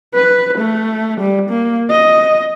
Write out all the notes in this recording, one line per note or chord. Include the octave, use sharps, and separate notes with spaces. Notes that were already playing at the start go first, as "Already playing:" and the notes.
B4
A3
G3
A#3
D#5